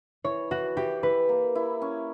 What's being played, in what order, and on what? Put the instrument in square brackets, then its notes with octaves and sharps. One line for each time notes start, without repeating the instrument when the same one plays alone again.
[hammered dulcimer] E3 [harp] C#5
[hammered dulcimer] E3 [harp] F#4
[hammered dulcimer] E3 [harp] G4
[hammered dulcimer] E4 [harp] B4
[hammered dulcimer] A#3
E4
C#4